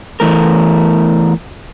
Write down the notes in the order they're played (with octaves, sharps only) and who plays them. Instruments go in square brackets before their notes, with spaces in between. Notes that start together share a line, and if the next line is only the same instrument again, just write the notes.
[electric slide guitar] E2 E3 A3 A#4